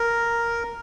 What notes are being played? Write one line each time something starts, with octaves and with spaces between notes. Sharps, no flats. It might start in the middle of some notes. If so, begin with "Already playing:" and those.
Already playing: A#4